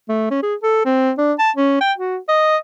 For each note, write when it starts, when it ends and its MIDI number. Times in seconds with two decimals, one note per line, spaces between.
0.09 0.26 57
0.31 0.41 61
0.43 0.55 68
0.63 0.84 69
0.85 1.12 60
1.18 1.33 62
1.39 1.51 81
1.56 1.77 61
1.80 1.93 79
1.98 2.17 66
2.28 2.57 75